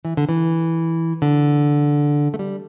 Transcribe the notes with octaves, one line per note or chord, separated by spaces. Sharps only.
E3
D3
E3
D3
A3
G3